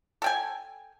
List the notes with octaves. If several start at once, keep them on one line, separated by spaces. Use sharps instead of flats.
A4 G5 G#5